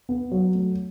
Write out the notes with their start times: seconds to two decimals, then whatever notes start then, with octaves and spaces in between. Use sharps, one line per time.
0.09 B3
0.32 F#3
0.55 A3